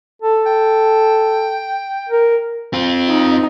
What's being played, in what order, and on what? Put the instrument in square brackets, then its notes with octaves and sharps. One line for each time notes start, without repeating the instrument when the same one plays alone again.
[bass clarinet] A4
[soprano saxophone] G5
[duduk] A#4
[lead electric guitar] C4 F4
[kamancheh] D#4